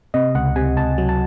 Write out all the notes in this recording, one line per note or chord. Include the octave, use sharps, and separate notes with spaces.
C3 D#5
C#2 F#5
C3 G#5
C#2 A5
F#3
A5